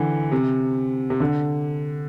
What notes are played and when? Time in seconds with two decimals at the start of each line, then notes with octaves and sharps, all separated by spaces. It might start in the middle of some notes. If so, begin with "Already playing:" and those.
Already playing: D3 E3
0.32 C3
1.10 C3
1.20 D3